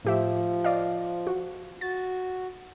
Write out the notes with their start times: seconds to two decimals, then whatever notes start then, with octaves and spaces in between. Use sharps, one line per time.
0.05 A2 F3 G4 E5
0.64 D5 D#5 F5
1.27 F#4
1.81 F#4 A6